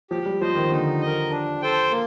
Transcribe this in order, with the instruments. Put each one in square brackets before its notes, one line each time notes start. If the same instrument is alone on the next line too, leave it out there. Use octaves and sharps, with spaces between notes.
[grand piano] F3 [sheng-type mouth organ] G4
[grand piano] G3
[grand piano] F3 [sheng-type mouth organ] C5 D#5
[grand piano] D#3
[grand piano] D3 [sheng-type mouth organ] D#4
[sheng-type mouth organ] D#5
A#4
D4
A4 C5 G5
A#3